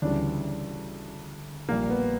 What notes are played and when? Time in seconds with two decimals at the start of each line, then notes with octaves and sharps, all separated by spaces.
0.02 D2 C#3 E3 G3 D4
1.69 A#1 A#2 G3 A#3
1.90 B3